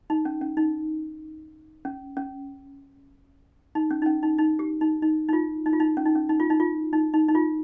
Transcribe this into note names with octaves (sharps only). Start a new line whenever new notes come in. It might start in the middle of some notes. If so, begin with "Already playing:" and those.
D#4
C#4
C#4
D#4
C#4
C#4
D#4
C#4
D#4
C#4
D#4
D#4
G4
D#4
D#4
D#4
F4
D#4
F4
D#4
C#4
D#4
C#4
D#4
F4
D#4
F4
D#4
D#4
D#4
F4